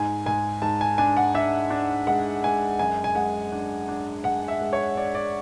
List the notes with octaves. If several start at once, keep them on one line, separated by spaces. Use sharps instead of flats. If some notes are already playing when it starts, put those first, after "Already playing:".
Already playing: G#2 G#5
G#2 G#5
G#2 A5
G#5
D4 G#5
F#5
D4 E5
D4
G#3 F#5
G#3 G#5
F#2 G#5
G#5
G#3 F#5
D4
D4
G#3 F#5
E5
G#3
C#5
D4 D5
D5